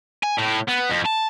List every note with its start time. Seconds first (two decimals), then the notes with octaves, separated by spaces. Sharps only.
0.23 G#5
0.38 A2
0.69 B3
0.90 F2
1.06 A5